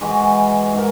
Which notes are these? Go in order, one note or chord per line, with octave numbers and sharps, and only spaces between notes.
E3 G#3 F#4
G#2 E3 A#4